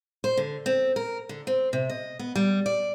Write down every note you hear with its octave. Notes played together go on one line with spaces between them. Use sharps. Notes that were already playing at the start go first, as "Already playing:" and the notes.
C5
D3
C4
A#4
D3
C4
C3
D#5
B3
G3
D5